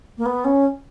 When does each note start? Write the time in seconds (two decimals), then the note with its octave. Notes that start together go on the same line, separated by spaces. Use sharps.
0.18 A#3
0.26 B3
0.45 C#4